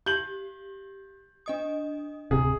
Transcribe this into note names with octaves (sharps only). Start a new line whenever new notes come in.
G4 G6 F#7
D4 D#5 D#6
D1 C3 G#4